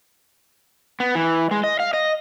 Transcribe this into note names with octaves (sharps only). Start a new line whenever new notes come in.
B3
E3
G#3
D#5
F5
D#5